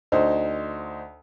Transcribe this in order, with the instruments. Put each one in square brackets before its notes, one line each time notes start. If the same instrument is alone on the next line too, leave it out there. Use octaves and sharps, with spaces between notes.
[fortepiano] D2 D#4 C5